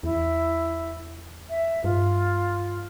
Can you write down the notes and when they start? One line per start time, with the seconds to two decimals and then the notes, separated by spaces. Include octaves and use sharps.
0.03 E2 E4
1.50 E5
1.84 G2 F4